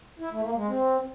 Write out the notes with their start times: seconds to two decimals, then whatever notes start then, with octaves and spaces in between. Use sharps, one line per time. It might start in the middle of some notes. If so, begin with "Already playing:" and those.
0.20 E4
0.32 A3
0.43 A#3
0.55 G#3
0.67 C4